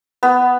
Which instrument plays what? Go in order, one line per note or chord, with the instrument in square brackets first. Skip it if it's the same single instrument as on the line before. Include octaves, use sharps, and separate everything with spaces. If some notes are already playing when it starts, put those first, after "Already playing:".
[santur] B3